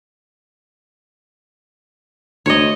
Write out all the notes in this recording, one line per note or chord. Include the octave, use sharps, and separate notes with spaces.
D2 C#5 D#5